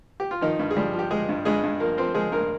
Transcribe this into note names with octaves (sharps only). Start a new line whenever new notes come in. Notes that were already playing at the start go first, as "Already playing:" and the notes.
G4
F4
D#3 F3 D#4
G2
G#4
F3 G3 G4
F3
G4
F3 G#3 G#4
G2
G2 G#3 G#4
G2
F3 A#3 A#4
F3 C4 C5
F3 G#3 G#4
G2 A#3 A#4